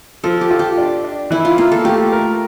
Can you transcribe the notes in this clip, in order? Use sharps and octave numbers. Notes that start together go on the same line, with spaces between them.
F3 A4
G4
F4
G4
D4
D4
E3 E4
F4
A#3 F4
A4
A3 G4
A#4